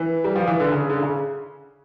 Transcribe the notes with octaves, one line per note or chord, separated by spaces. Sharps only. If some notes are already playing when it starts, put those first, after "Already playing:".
Already playing: E3
G3
F3
E3
D3
C#3
D3
C#3